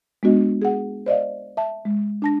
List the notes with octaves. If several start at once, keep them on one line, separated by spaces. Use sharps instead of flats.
G#3 B3 D4 F#4 D#5
G#4 F#5
C5 D5 D#5 F5
E5 A5
G#3
D4 A5 A#6